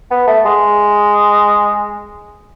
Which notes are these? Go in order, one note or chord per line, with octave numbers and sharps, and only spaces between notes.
B3
A3
G#3